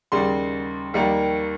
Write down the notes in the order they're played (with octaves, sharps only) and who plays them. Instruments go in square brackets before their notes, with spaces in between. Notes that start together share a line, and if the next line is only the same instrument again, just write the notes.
[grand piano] D#2 C#3 G3 C6
D#2 D#3 G3 A#3